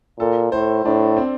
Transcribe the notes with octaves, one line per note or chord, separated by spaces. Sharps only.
A#2 A4
A2 C5
A2 D4
C4